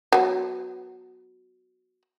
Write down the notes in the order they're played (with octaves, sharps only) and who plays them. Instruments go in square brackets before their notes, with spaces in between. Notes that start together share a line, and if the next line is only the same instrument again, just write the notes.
[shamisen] F#3 B3